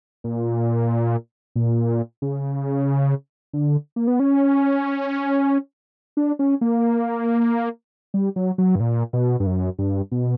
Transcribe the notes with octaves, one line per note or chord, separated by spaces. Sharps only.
A#2
A#2
C#3
D3
A#3
B3
C#4
D4
C#4
A#3
G3
F#3
F#3
G2
A#2
B2
G2
F#2
G2
B2